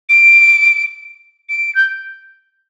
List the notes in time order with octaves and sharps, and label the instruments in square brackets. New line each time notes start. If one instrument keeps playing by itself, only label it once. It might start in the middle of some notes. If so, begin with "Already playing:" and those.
[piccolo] D7
D7
G6